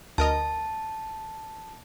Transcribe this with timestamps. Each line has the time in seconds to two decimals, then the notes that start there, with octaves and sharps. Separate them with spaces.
0.18 D2 A#4 D#5 A5